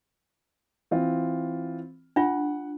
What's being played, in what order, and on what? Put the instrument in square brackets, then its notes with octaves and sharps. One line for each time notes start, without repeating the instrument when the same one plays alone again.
[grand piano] E3 C4 F4
[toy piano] D4 F4 [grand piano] F#5